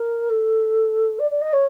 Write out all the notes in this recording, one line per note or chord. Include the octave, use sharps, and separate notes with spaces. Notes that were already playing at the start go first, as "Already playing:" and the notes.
Already playing: A#4
A4
D5
D5
D#5
C#5